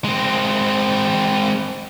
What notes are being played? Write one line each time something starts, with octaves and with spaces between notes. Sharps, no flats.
G#3 C4